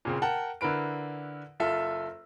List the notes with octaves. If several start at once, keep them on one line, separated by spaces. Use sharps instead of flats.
A#2 C#3 C4
A#4 F#5 G5 A5
D3 E4 A#4 B4 D7
F#1 F4 A4 E5